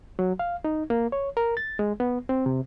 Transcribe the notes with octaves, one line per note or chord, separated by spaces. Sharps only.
F#3
F5
D#4
A#3
C#5
A#4
A6
G#3
B3
C4
C3